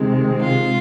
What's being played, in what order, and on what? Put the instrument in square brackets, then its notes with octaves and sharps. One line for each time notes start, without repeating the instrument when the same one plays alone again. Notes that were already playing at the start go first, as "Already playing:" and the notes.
Already playing: [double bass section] C3 D#3 G#3 C4
[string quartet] F4